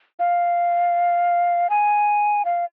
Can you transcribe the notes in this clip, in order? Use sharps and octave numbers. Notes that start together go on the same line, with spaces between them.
F5
G#5
F5